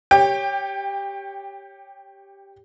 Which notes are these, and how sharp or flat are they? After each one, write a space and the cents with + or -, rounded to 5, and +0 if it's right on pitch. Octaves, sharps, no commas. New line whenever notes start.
G4 +0 C#5 +0 G5 +25